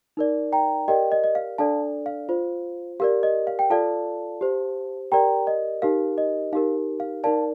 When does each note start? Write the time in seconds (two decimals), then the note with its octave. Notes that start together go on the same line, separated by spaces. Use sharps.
0.17 D#4 A#4 D5
0.53 G5 A#5
0.88 G4 A#4 D5 D#5 G5
1.12 D#5
1.24 D#5
1.35 F5
1.58 D4 A4 D5 F5 A5
2.06 F5
2.29 F4 C5
3.00 G4 A#4 D5 F5
3.23 D#5
3.47 F5
3.59 G5
3.70 F4 A4 D5 F5 A5
4.41 G4 C5
5.12 G4 A#4 D5 G5 A#5
5.47 D#5
5.82 D#4 G4 A#4 F5
6.18 D#5
6.53 D#4 G4 A#4 F5
7.00 F5
7.24 D#4 A#4 D5 F5 A5